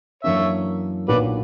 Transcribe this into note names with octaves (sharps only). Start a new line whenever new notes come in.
F#2 E3 A#3 D4 C#5 E5
B1 A#2 A#3 D4 F#4 B4 D5